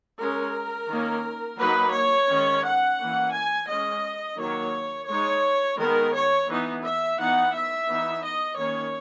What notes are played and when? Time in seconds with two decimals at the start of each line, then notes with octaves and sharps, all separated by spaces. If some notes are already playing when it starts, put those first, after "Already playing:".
0.19 G#3 C#4 A#4
0.89 D#3 A#3 C#4
1.58 F#3 A#3 D#4 B4
1.93 C#5
2.29 D#3 G#3 C#4
2.64 F#5
2.99 E3 A#3 C#4
3.33 G#5
3.68 G#3 C#4 D#5
4.38 D#3 F#3 A#3 C#5
5.08 G#3 D#4 C#5
5.78 D#3 G#3 B3 A#4
6.13 C#5
6.48 E3 B3 D#4
6.83 E5
7.18 E3 B3 D#4 F#5
7.53 E5
7.88 E3 B3 D#4
8.23 D#5
8.58 D#3 A#3 C#4 C#5